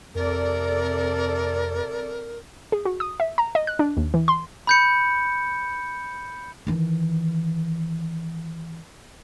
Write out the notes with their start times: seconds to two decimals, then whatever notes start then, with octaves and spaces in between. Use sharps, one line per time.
0.15 F2 C3 A4 A#4 D5
2.72 G#4
2.85 F#4
3.00 D#6
3.20 E5
3.38 A#5
3.55 D#5
3.67 F#6
3.79 D4
3.97 D#2
4.14 E3
4.28 C6
4.67 B5 G6 C#7
6.67 D#3 E3